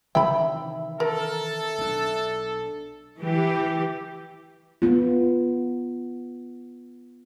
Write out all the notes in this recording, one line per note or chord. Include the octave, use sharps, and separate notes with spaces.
C3 D#3 E3 E5 G5 B5
A4 A#4
B1 D4
E3 G4
B3 F4